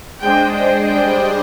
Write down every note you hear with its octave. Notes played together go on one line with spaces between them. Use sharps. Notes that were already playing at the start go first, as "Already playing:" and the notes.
G#3 D4 G#4 C5 D#5 G5
G5
G3 D4 G#4 C5 D#5 G5